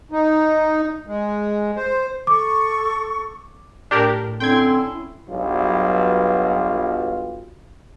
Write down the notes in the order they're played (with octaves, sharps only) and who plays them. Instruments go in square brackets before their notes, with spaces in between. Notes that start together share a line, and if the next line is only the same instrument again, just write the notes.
[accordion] D#4
G#3
C5
[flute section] A4 C#6 [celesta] D6
[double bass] A2 [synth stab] D4 G4 A#4
[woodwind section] D3 C4 C6 [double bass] C#4 E4 [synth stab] G5 G#6
[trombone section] B1 G2 F#3 F4